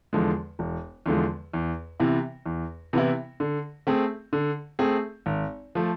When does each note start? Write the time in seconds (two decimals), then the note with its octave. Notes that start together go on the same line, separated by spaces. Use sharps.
0.13 E2 D3 F3 G#3
0.59 E1
1.06 E2 D3 F3 G#3
1.53 E2
2.00 C3 E3 B3 E4
2.46 E2
2.93 C3 E3 B3 E4
3.40 D3
3.87 A3 C4 G#4
4.33 D3
4.79 A3 C4 G#4
5.26 G#1
5.75 F3 A3